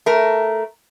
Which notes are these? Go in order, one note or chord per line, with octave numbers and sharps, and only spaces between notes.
A3 A#4